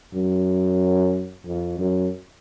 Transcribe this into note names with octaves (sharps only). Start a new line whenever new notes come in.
F#2
F2
F#2